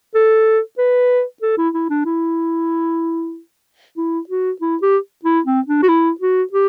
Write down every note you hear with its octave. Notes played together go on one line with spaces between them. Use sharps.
A4
B4
A4
E4
E4
D4
E4
E4
F#4
E4
G4
E4
C4
D4
F#4
E4
F#4
G4